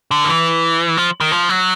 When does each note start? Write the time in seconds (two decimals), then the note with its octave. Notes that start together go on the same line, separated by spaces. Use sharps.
0.11 D3
0.24 D#3
0.29 E3
0.97 F3
1.20 D#3
1.32 F3
1.49 F#3